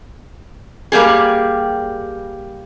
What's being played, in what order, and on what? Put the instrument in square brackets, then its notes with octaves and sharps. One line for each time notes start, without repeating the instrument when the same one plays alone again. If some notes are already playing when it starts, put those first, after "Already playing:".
[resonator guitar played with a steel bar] G3 A#3 C#4 G4 G#4